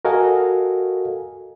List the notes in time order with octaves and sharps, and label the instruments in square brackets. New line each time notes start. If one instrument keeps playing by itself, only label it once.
[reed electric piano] F#4 A4 A#4 D#5 F5 G#5